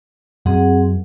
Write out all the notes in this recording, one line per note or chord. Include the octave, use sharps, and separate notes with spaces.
F#2 C4 G#4 F#5